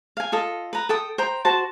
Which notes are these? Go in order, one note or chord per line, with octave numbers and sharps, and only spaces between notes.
F5 G#5
F4 A4 D#5
B4 A#5
A4 G5 D#6
C5 G5 A#5
F#4 C5 A5